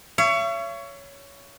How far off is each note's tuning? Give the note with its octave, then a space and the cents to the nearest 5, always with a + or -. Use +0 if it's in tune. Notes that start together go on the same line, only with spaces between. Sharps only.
C#5 +15 E5 +45